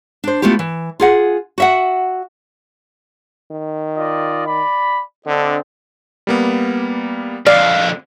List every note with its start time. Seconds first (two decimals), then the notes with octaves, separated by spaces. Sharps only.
0.24 D4 C5
0.42 A3 B3 E4 F4 G4
0.59 E3
1.00 F4 G#4 F#5
1.58 F#4 E5 F#5
3.51 D#3
3.97 F4 D5 D#5
4.47 D5 B5
5.27 D3 C4 D4 D#5
6.27 G3 A#3 B3
7.47 F2 D3 D5 F5